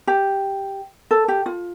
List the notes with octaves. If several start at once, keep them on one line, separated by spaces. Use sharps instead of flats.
G4
A4
G4
F4